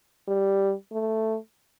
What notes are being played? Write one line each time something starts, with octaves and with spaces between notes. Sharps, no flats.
G3
A3